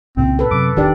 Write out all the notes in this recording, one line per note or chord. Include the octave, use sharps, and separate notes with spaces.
C2 A#2 C#3 C4
A4 B4
F#2 C3 D6
E1 D#3 D4 G4 D5